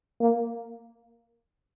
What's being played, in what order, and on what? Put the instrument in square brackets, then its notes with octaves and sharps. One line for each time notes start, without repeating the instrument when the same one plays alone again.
[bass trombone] A#3